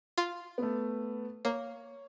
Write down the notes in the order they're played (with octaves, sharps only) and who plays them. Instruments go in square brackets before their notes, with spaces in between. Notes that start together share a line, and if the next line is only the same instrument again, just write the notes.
[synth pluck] F4
[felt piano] A3 B3
[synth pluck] A#3 [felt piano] C#5